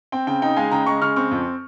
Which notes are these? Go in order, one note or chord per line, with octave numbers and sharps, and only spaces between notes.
C4 G5
C#3 G5
D#4 G5
G#3 F5 G#5
C#3 G5 A#5
G#3 A#5 C#6
C#3 C#6 F6
C4 C#6 F6
F2